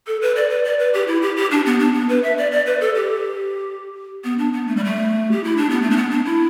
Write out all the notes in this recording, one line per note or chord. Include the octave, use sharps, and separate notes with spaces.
A4
B4
D5
B4
D5
B4
G4
E4
G4
G4
D4
B3
D4
B3
B4
E5
D5
D5
B4
A4
G4
B3
D4
B3
A3
G3
A3
G4
E4
D4
B3
A3
D4
B3
D4
E4